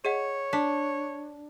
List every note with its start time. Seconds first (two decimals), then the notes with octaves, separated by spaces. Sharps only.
0.05 G#4 C#5 D#5 F#5
0.53 D4 B6